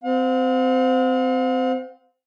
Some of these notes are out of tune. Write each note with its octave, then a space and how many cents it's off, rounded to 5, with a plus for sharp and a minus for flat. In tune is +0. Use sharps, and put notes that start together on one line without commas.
C4 -20 F5 +45